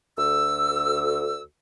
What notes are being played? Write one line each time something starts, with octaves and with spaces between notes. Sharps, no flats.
D2 E6